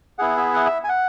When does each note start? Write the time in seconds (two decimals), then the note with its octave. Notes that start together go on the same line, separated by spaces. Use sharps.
0.18 B3 E4 G#4 F#5
0.37 E5
0.54 F#5
0.66 E5
0.84 G#5
0.89 F#5